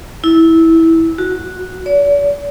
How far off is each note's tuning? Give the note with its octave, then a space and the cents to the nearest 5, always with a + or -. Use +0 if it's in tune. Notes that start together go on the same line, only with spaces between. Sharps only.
E4 -15
F#4 -5
D5 -45